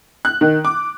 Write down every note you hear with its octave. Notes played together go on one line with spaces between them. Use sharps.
F#6
D#3
D6